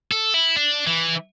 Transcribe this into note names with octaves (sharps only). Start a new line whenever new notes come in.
A4
E4
D4
E3